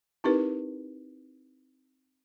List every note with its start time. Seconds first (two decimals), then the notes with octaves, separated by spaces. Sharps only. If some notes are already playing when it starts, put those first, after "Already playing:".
0.24 C4 D#4 E4 G4 A#4 B4